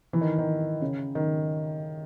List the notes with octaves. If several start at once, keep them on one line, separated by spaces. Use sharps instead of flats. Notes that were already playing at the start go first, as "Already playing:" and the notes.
E3
D#3
D#3
C#3
D#3